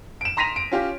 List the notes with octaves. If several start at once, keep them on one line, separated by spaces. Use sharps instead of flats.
D7 E7
A#5 C6 A#6 B6 D#7 F7
D7
C#4 F4 G4